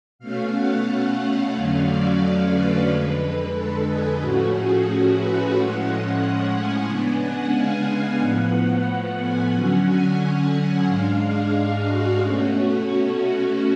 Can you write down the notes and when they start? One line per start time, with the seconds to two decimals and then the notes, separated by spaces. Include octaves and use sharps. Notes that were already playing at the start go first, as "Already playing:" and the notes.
0.19 B2 A3 C#4 F5
0.52 F#5
0.86 F5
1.52 F2 D3 F#3 A3 C#4
1.86 D5
2.19 D5
2.52 B4
2.86 F2 D3 G#3
3.52 A4
3.86 G#4
4.19 A2 F3 A3 C#4 F#4
4.52 G#4
5.19 B4
5.53 A2 F3 G#3 C#4 F#5
6.52 G#5
6.86 C#3 G#3 B3 D4
7.19 F#5
7.52 F5
8.19 A2 F3 B3 F#5
9.19 G#5
9.52 D3 F#3 C#4 F#5
9.86 G#5
10.19 G#5
10.53 F#5
10.86 G#2 G#3 D4 F5
11.19 G#4
11.53 G#4
11.86 F#4
12.19 B2 A3 C#4 F#4
13.19 F#4